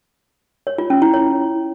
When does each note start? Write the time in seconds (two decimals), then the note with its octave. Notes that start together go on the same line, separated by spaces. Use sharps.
0.67 C#5
0.78 F4
0.90 C#4
1.02 E4
1.14 C#5